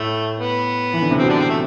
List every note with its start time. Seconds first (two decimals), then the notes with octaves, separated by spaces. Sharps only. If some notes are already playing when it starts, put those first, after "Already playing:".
Already playing: A2 A3
0.39 B3
0.94 E3
1.02 D3
1.11 C3
1.19 B2 C4
1.29 D3 D4
1.39 C4
1.50 A3